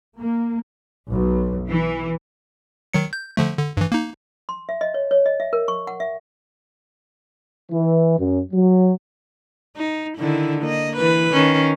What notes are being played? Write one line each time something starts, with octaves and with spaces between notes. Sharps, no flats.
A#3
B1
E3
D#3 F#3 C#7
G6
D3 F3 A3
D3
G2 E3
A#3 D#4
C6
E5
D#5
C#5
C#5
D#5
E5
A#4
C#6
F#5
E5
E3
F#2
F#3
D#4
D3 D#3 E4
A#3 D#5
E3 B4
D#3 C#4